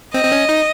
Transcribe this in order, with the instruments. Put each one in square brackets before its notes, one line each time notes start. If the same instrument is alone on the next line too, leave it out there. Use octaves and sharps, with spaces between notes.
[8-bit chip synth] C4 [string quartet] D#5
[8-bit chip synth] C4
C#4
D#4